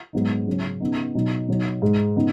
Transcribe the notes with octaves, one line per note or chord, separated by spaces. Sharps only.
G#2 F#3 B3 D#4
C#3 F#3 C#4
C#3 B3 D#4
B2 F#3 D#4
B2 F#3 D#4
G#2 G#3 D#4
C#3 B3 D#4